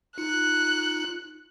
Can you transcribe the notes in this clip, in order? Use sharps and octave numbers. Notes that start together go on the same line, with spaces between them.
D#4 F4 F#6 C#7